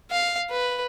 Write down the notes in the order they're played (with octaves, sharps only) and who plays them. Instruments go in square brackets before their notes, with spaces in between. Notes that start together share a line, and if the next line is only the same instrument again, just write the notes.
[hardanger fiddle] F5
B4